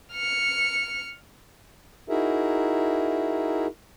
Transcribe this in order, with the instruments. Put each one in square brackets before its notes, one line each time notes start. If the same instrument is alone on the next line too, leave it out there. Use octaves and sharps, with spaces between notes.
[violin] F6 C#7
[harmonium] D#4 E4 F#4 G#4 A#4 E5